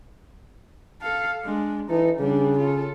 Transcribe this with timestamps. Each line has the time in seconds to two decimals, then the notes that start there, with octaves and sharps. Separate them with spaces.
1.01 A4 F5
1.43 G#3 D4
1.90 E3 D#4 A4
2.19 C#3 G3 D4
2.58 F4 A4